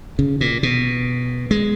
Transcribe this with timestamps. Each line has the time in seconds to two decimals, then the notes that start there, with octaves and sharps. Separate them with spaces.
0.19 C#3
0.41 A#2
0.63 B2
1.51 G#3